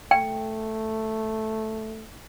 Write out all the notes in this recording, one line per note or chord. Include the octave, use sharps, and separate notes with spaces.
A3 G5